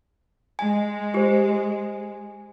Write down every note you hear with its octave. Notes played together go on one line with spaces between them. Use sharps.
G#3 G#5
G4 C5